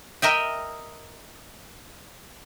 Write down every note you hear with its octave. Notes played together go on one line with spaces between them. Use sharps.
A#4 D#5 E5 G5